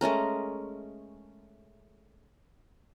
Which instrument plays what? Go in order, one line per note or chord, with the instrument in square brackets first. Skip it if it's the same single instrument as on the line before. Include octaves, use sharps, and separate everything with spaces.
[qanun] G#3 A3 C#4 A#4